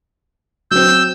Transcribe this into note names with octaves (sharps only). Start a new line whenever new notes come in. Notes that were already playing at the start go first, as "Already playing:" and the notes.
F#3 C4 E6 G6